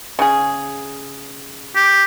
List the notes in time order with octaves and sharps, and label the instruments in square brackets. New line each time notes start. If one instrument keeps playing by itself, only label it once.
[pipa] C#3 G#4
[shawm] G4